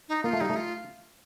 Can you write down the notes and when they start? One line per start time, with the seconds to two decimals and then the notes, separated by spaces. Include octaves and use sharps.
0.09 D#4
0.24 A#3 F4
0.33 A3
0.41 G3 D#4
0.50 A3
0.56 F4